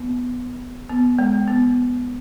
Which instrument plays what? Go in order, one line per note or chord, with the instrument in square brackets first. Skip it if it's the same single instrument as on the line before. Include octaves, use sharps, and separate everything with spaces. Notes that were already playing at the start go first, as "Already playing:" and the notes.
Already playing: [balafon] B3
B3
G#3
B3